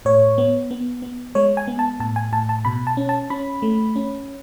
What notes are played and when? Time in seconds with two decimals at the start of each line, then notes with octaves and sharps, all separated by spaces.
0.05 A2 C#5
0.38 B3
0.71 B3
1.02 B3
1.35 G#3 C#5
1.57 G#5
1.68 B3
1.79 A5
2.00 A2 A5
2.16 G#5
2.33 A2 A5
2.49 A5
2.65 B2 B5
2.87 A5
2.97 C#4
3.09 A5
3.30 C#4 B5
3.62 A3
3.96 C#4